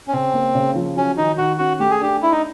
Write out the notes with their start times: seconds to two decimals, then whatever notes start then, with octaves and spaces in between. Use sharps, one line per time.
0.08 C#4
0.13 C#3 C4
0.34 A#3
0.55 C#3
0.76 F3
0.97 F#3 C#4
1.17 D#3 D#4
1.38 D#3 F#4
1.59 C#4 F#4
1.80 A3 G4
1.90 G#4
2.01 D4 G4
2.21 D4 E4
2.32 D#4